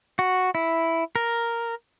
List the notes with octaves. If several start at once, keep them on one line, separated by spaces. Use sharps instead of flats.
F#4
E4
A#4